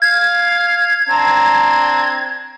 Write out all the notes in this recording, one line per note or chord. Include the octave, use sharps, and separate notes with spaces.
F5 G#6
C4 D4 A#5